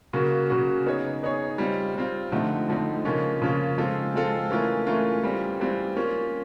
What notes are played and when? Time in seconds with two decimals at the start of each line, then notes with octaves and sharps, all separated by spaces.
0.13 C#3 F#3 A#3 C#4 F#4
0.50 C#3 F#3 A#3 C#4 F#4
0.86 B3 D#4 G#4 C#5
1.23 B3 D#4 G#4 C#5
1.58 G3 C4 F4
1.95 G3 C4 F4
2.32 D3 F3 A3 C4 D#4
2.68 D3 F3 A3 C4 D#4
3.05 C#3 F3 A#3 C#4 F4
3.42 C#3 F3 A#3 C#4 F4
3.78 F3 G#3 C4 F4 A4
4.14 F3 G#3 C4 F4 A4
4.51 E3 A3 C#4 F4 A#4
4.87 E3 A3 C#4 F4 A#4
5.23 E3 G3 C4 F4
5.60 E3 G3 C4 F4
5.96 A#3 C#4 F4